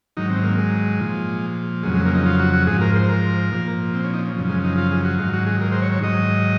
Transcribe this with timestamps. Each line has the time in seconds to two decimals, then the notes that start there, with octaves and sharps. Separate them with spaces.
0.17 G#2 D#3 F#3 D#4
0.30 C4
0.44 A#3
0.58 G#3
1.00 A#2 F3
1.83 F2 C#3 F#3 G#3
1.94 G#3
2.05 A#3
2.14 D#4
2.26 F4
2.40 F#4
2.53 F#4
2.67 G#2 F3 G#4
2.81 A#4
2.96 C5
3.09 A#4
3.52 A#2 F3
3.94 C4
4.04 C#4
4.14 D#4
4.25 C#4
4.35 F#2 C#3 F3
4.49 G#3
4.64 D#4
4.78 F4
4.92 G#4
5.05 F#4
5.18 G#2 D#3 F#3 F4
5.33 F#4
5.47 G#4
5.61 A#4
5.72 C5
5.82 C#5
5.92 C#5
6.02 G#2 D#3 F#3 D#5